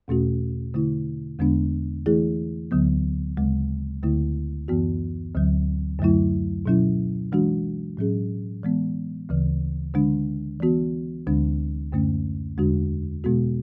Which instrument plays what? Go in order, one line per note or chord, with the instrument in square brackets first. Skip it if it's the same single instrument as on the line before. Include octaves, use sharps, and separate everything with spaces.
[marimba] E2 B2 A3 C#4 F#4
D3 A3 E4
E2 D3 G#3 B3 D4
E3 A3 E4 G#4
D2 D3 F#3 B3
D2 C#3 G#3
D2 D3 A3 E4
F#2 E3 B3 F#4
D2 D3 F#3
F#2 D3 F#3 A3 E4
B2 F#3 C#4 E4
E3 G#3 D4 F#4
A2 F#3 C#4 G#4
E3 G#3 B3
D2 C#3 E3
D3 G#3 D4
E3 B3 F#4
D2 D3 G#3 D4
F#2 D3 A3 C#4
E2 D3 G#3 D4 F#4
B2 G#3 B3 F#4